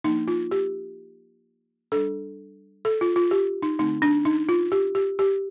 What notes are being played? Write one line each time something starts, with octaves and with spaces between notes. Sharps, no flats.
F3 A#3 D4 D#4
F4
G4
G3 D4 A4
A4
F4
F4
G4
D#4
D3 A3 C4 D#4
D4
D#4
F4
G4
G4
G4